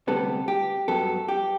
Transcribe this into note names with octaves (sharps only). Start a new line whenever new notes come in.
D2 C3 G3 B3 A4
G4
G2 F#3 B3 A4
G4